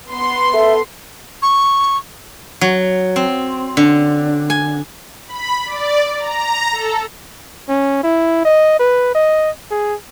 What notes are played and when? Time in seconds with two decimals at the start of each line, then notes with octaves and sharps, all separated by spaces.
0.10 B3 C6
0.54 A4 E5
1.42 C#6
2.61 F#3
3.16 C4
3.77 D3
4.50 G#5
5.27 B5
5.66 D5
6.18 A#5
6.72 A4
7.69 C#4
8.04 E4
8.45 D#5
8.80 B4
9.15 D#5
9.71 G#4